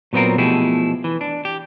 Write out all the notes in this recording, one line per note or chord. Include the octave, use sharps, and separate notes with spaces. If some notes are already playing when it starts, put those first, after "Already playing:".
A#2 F#3 B3 C4 F4 A#4
B2 F3 A3 E4 G4 G#4
E3
D4
G4